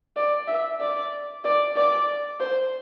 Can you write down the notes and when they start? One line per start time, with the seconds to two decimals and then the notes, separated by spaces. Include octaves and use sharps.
0.16 D5
0.47 E5
0.80 D5
1.44 D5
1.76 D5
2.40 C5